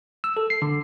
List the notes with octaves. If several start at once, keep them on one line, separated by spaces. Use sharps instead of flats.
E6
A4
C7
D3